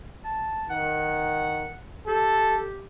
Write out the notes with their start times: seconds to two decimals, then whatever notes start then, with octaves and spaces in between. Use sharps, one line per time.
0.24 A5
0.70 D#3 F#5
2.07 G4 A4